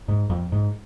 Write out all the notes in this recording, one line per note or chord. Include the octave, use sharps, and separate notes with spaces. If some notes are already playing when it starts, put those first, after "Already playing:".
G#2
F2
G#2